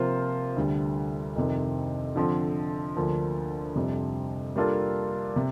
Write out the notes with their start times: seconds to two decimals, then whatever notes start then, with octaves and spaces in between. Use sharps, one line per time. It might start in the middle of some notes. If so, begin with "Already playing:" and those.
Already playing: C3 F3 A#3 F4 C5
0.57 D2 D3 G3
1.36 F2 C3 D#3
2.16 D3 F3 C4
2.96 D2 D3 F3 A#3
3.75 F2 C3 G3
4.56 G3 A#3 D4 F4 A4
5.36 C3